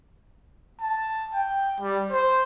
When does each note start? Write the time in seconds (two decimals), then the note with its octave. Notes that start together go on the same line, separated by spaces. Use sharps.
0.80 A5
1.34 G5
1.80 G3
2.12 C5